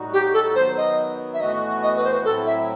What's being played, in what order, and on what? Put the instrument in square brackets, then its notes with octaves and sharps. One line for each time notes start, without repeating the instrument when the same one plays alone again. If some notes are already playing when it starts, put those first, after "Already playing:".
Already playing: [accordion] A2 G3 D#4 F#4
[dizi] G4
A4
[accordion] D#3 F#3 B3 [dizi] C5
[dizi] D#5
E5
[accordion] A2 E3 B3 F#4 [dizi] D#5
[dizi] D#5
B4
C5
[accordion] A2 F#3 C4 E4 [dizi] A4
[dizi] E5